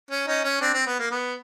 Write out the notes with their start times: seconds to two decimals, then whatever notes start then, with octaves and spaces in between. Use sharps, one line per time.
0.11 C#4
0.27 C#4 D#4
0.44 C#4
0.61 C4 D4
0.74 C4
0.86 B3
0.99 A#3
1.11 B3